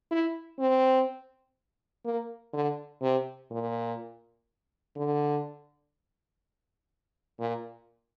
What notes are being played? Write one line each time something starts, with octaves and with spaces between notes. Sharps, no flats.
E4
C4
A#3
D3
C3
A#2
D3
A#2